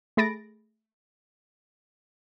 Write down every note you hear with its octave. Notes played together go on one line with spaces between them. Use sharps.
A3 G#4 B5 A6 A#6 D7